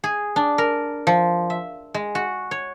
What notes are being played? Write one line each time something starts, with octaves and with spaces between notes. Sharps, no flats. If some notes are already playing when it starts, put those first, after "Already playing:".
G#4
D4
A#4
F3
E5
G#3
F#4
C#5